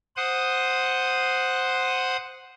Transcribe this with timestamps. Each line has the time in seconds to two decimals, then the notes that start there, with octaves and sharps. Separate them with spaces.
0.17 C5 F#5 D#6